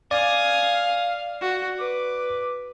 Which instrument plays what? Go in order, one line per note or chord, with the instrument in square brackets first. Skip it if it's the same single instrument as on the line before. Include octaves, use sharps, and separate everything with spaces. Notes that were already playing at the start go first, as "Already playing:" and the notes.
[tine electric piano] D5 [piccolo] F5 [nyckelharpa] G#5 D#6
[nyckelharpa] F#4
[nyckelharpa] B4 [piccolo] D6